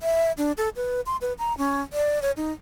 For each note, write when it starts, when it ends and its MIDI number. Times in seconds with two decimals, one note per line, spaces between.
0.01 0.32 76
0.38 0.52 62
0.58 0.69 69
0.76 1.01 71
1.06 1.17 84
1.21 1.33 71
1.39 1.56 82
1.58 1.81 61
1.93 2.21 74
2.22 2.31 73
2.37 2.52 63